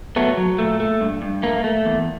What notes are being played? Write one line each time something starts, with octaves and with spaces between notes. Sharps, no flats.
F#3 A3 B3
F#3
A#2 A3
A3
G2
G2
A3 A#3
A3
E2